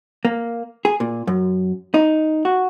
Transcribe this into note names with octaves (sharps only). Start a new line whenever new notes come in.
A#3
G#4
A#2
F#2
D#4
F#4